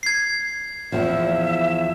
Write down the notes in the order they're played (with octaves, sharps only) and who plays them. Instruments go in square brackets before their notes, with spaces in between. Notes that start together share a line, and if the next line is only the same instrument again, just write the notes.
[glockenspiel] G#6 C7
[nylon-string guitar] E2 G2 F3 [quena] E5